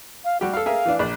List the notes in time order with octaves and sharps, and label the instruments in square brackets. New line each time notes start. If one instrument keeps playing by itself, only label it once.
[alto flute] F5
[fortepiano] G3 G4 [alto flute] F#4
[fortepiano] A4 F5
[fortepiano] G#4 A#4 E5 [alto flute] F5
[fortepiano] E3 D4
A#1 D5